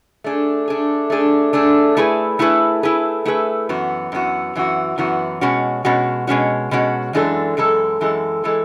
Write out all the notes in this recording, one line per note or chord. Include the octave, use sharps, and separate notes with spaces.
A3 D4 G#4
A3 D4 G#4
A3 D4 G#4
A3 D4 G#4
A3 E4 G#4 B4
A3 E4 G#4 B4
A3 E4 G#4 B4
A3 E4 G#4 B4
F#2 E3 B3 F#4
F#2 E3 B3 F#4
F#2 E3 B3 F#4
F#2 E3 B3 F#4
B2 G#3 C#4 F#4
B2 G#3 C#4 F#4
B2 G#3 C#4 F#4
B2 G#3 C#4 F#4
F#2 E3 G#3 D4 A4
F#2 E3 G#3 A4
F#2 E3 G#3 A4
E3 G#3 A4